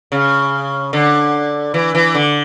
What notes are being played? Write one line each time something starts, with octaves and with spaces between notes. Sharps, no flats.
C#3
D3
E3
E3
D3